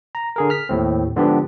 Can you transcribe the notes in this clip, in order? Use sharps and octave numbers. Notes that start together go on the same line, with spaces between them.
A#5
D3 G#4 A#4
F6 B6
D#2 A2 C4
G#2 D3 F3 B3 D4 G4